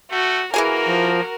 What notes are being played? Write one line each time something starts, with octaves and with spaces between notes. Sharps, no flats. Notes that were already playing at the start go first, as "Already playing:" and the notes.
A3 F#4
E3 A#3 F#4 G#4 A#4 G#5
F3